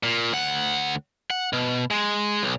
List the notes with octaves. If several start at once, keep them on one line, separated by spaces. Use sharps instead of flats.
A#2
D2 F#5
F#5
B2
G#3
B1